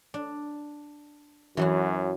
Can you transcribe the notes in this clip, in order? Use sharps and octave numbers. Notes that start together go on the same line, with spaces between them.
D4
F#2 E3 F#3 F#4